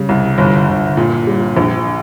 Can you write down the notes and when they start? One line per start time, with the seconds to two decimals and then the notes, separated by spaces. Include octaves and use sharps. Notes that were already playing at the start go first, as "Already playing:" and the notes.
Already playing: C#3 G3
0.09 C2
0.38 G1
0.69 G1
0.97 A#2
1.27 G3
1.57 A#1